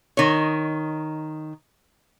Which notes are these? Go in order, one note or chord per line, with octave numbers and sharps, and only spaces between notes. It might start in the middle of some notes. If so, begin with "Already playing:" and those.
D#3 C#5